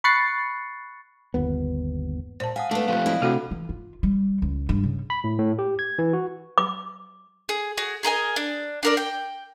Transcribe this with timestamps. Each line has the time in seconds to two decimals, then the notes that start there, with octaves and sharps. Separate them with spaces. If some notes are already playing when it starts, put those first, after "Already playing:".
0.04 B5 C#6 F#6 A6 C7 C#7
1.34 G1 D#2 B3
2.40 A#2 C5 A5
2.56 F5 F#5 G#5 D#6
2.71 A3 B3 D4 A5
2.88 F3 A3 C4 F5 F#6
3.06 E4 D5 D#5
3.22 C3 A3 D4 F#4 A4 F#5
3.51 E3
3.69 F4
4.03 G3
4.42 C#2
4.69 G2
4.84 C#3
5.10 B5
5.24 A2
5.39 A2
5.59 G4
5.79 G#6
5.99 E3
6.13 F#4
6.58 D6
7.49 G#4
7.77 F#4 G#4
8.03 G#4 A#4 D#5 G#5
8.36 D4
8.83 D4 A#4 D5
8.97 G5